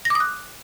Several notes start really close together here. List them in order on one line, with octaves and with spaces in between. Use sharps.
A#6 D6 D#6 F#6